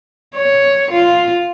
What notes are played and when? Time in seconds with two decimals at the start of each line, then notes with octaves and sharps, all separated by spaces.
0.35 C#5
0.91 F4